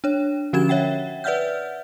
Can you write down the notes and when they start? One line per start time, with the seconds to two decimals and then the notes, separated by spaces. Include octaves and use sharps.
0.04 D4 C#5
0.53 D3 F3 C#4 F#4 G#6 E7
0.69 C#5 E5 F#5 G5
1.24 B4 D5 E5 F#5 F6 G6